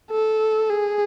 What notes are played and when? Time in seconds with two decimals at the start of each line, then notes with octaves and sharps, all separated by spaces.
0.11 A4
0.70 G#4